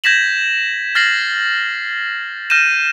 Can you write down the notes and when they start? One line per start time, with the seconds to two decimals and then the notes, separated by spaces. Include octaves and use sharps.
0.04 G6 G#6 A#6 B6 E7 F#7
0.95 F6 A6 A#6 C7 F#7
2.50 F6 G6 A#6 D#7 E7